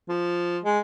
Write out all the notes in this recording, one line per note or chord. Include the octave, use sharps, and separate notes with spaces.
F3
G#3